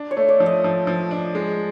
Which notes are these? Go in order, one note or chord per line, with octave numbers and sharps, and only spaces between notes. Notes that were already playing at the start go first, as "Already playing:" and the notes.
Already playing: D4
C#5
A3
D5
F3
D#5
F3
F3
D4
G#3